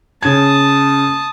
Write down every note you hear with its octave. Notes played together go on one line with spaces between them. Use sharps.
C#3 A5 D#6 G#6